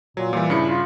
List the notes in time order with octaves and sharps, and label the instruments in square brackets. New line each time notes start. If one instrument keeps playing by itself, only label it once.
[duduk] A#2 [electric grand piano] F#3
[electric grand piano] A#2 G3 [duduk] E3
[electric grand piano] G2 C#3 C#7 [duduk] E4
[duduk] F4